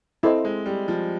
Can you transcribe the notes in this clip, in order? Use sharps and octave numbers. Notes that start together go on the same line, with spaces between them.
C4 E4 A4 C5 D#5
G#3
G3
F3